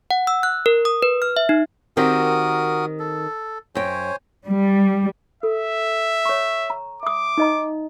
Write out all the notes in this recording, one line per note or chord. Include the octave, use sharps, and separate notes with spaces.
F#5
E6
F#6
A#4
D#6
B4
F6
E5
D#4
D#3 C4 F#4 G4 A#4 D#6
A4
F#2 C5 C#5 G5 G#5
G3
A4 E5
C#5 C#6
A#5
E5 D6 D#6
D#4 D#5 A#5